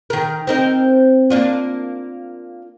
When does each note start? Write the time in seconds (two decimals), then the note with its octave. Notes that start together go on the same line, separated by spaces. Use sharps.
0.10 D#3 A#4
0.47 C4 D#4 A#4
1.30 A#3 D4 F4